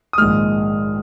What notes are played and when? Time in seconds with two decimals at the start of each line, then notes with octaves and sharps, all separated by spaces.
0.13 D#6
0.18 A#1 G#2 D#3 G#3 F6